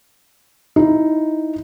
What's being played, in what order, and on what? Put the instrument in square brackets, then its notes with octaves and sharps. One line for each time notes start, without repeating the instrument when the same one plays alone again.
[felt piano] D#4 E4